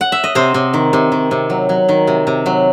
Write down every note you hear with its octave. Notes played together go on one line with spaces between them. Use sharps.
F#5
E5
D#5
C3 C5
C3
D#3
C3
D#3
C3
F#3
F#3
D#3
C3
C3
F#3